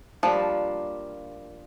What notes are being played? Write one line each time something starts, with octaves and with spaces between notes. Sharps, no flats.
F3 G3 A#3 D4